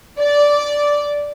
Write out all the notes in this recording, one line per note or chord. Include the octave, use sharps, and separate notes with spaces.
D5